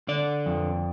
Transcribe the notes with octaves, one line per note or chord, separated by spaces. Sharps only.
D3 D5
F2